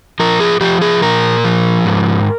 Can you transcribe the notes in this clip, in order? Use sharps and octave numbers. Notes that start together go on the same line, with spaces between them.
F3 A#4
G#4
F3 G4
G#4
A#2 A#4
F3
G#2